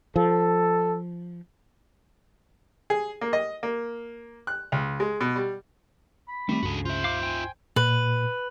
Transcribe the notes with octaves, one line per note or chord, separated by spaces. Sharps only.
F3 A4
G#4
A#3
D#5
A#3
F#6
C#2
G#3
B2
G3
B5
D#3 G3 A3 C4 C#4
C#2 G2 C#3 F#4 A4
F4 C5 E5
F5 D6
G5 G#5
A#2 B4